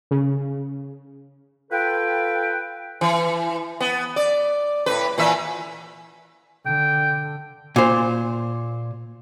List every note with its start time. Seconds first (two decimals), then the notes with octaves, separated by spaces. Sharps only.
0.11 C#3
1.71 F4 A4 B4 G5
3.01 E3
3.80 B3
4.16 D5
4.86 A2 B4
5.18 A#2 E3 E5
6.66 D3 G5
7.76 A#2 C5